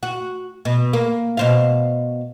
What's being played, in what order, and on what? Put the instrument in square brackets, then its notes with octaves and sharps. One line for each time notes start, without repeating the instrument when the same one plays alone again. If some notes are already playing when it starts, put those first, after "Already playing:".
[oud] F#4
B2
A#3
B2 C5 F5